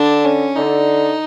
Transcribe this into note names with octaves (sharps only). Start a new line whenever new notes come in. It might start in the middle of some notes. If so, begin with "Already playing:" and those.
Already playing: D3 D4
C#4
D3 D#4